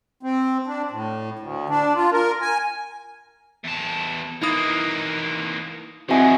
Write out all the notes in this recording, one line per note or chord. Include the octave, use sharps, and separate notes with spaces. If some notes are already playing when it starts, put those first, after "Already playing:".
C4
D4
A2
D2
D4
F4
A#4
G#5
E2 A5
E3 A#3 D#4 E4 D#6
G2 F3 C4 E4 F#4 D#5 F#5 G#5